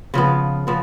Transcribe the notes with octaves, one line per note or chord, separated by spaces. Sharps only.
C#3 F3 B3
C#3 F3 B3